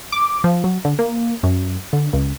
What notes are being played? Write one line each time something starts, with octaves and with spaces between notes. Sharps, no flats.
D6
F3
F#3
D3
A#3
F#2
D3
C#2